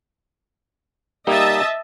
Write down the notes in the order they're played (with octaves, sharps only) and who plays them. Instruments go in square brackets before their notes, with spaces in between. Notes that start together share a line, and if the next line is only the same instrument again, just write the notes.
[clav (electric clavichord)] G3 A#3 D#4 [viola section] D#5 E5 A5